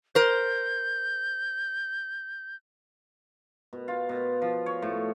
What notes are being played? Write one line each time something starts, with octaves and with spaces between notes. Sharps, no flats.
A#4 C5 G6
B2
F4
B2
F3
C#5
A2